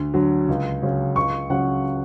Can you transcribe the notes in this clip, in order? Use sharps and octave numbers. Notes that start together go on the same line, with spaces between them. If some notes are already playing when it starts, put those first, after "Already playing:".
Already playing: D2
D3 F#3
C#2
C#3 F#3 C#4
C#2 C#6
C#3 F#3 C#4 F#5